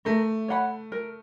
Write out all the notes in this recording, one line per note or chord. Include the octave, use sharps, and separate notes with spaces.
A3 A#4
C#5 F#5 B5
A#4